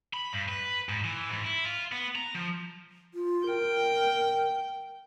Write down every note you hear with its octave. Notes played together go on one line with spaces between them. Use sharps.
B5
G2
B4
G#2
E3
G#2
E4
F4
B3
A#5
F3
F4
A#4 G5